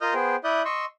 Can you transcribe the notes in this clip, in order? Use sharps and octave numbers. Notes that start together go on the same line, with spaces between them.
F4 A#4 D#5 D#6 F6 G6
B3 G#4 C5 G5
E4 D5 E5 D#6 F#6 G6
D#5 C6 C#6 E6